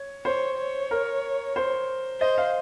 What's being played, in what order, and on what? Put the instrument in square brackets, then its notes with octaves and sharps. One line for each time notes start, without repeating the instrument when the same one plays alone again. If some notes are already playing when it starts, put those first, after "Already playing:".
Already playing: [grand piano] C#5
[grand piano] C5 [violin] C#5
[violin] C#5
[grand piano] A#4
C5
[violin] C5 [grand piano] D#5
[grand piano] F5